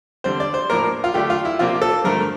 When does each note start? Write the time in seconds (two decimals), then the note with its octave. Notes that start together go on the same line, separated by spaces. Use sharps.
0.24 D3 G3 C4 C5
0.40 D5
0.54 C5
0.70 A2 F3 A#3 D4 A#4
1.04 F4
1.14 D3 A3 D4 G4
1.30 F4
1.45 E4
1.59 C3 F3 A#3 D4 F4
1.82 A4
2.04 G2 D3 F3 A3 A#4